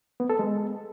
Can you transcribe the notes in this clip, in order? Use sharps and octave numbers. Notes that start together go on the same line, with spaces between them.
B3
A4
G#3